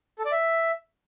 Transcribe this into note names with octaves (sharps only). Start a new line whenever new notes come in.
A4
D5
E5